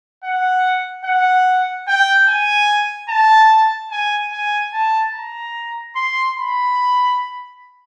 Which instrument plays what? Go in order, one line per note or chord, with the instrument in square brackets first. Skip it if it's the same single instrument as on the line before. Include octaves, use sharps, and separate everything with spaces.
[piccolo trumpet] F#5
F#5
G5
G#5
A5
G#5
G#5
A5
A#5
C6
B5